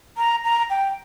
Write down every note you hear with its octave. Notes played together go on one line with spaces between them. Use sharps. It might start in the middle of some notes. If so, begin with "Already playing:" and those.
A#5
A#5
G5